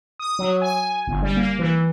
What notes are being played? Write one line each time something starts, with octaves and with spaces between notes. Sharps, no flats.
D#6
F#3
G#5
G1
G3
A#3
E3